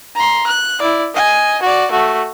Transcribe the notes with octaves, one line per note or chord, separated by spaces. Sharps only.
A#5 C6
F#6
E4 D5
D#5 G#5
F#4 D5
A3 F#4